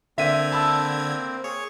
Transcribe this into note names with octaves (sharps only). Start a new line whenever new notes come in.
D3 A#3 C4 E5 G#6 B6 D#7
A5 B5 E6
G#4 C#5